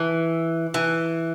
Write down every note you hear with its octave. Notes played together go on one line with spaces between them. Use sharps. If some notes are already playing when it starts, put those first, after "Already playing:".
Already playing: E3
E3